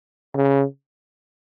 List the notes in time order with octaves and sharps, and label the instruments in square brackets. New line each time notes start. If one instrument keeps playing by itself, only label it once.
[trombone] C#3